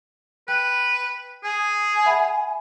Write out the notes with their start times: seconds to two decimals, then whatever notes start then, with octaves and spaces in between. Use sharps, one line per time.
0.48 B4 G5 F#6
1.44 G#4 G#5
2.06 E5 F#5 B5